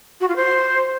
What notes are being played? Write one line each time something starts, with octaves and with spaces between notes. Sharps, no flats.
F#4
F4
C5